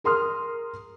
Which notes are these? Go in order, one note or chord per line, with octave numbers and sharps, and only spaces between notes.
G#4 A#4 C6 D#6 F6